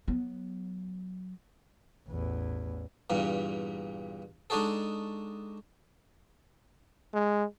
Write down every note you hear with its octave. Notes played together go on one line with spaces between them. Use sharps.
F#3 B3
A1 E2
E2 G2 A#2
G#3 D4 D#4 F#4 G#4 A4
G#3